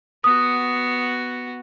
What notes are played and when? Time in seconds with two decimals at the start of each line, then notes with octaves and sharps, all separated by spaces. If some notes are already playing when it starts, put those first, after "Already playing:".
0.24 B3 F#4 D#6